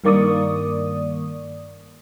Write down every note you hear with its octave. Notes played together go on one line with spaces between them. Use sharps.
G2 D#3 A#3 D5 C#6 D#6